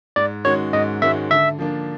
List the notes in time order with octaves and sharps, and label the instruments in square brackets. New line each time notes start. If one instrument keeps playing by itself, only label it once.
[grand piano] G#2 [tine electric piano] D5
[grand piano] D#3 G#3 C#4 F#4 [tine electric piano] C#5
[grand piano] G#2 [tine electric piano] D#5
[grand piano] D#3 G#3 C#4 F#4 [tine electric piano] E5
[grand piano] D3 [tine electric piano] E5
[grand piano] F3 A#3 D4